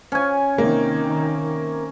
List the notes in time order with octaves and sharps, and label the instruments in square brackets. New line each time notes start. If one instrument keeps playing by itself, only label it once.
[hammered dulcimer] C#4 G#5
[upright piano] C3 A#3 [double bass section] D#3